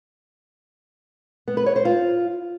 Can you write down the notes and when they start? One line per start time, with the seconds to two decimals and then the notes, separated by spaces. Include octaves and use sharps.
1.48 B3
1.57 B4
1.66 C#5
1.76 C5
1.85 F4